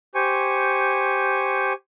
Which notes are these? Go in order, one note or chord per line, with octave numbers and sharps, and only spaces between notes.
G4 C5 G#5 C#6